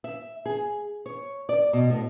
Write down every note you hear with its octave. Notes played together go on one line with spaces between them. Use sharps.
E5
G#4
C#5
D5
B2
A2